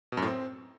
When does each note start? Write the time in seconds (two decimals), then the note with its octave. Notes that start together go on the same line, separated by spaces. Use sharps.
0.12 B2
0.17 F#2
0.22 A2
0.27 C4